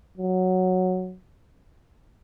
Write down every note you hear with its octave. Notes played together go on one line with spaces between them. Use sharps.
F#3